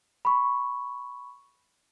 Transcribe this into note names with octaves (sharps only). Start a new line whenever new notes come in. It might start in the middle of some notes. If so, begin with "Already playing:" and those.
B5 C#6